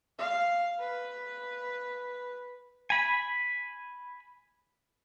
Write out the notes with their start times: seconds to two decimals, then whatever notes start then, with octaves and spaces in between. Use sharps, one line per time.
0.19 F5
0.79 B4
2.90 G#5 B5